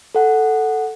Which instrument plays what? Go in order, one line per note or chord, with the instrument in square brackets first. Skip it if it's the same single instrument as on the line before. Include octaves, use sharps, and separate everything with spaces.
[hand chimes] A4 F#5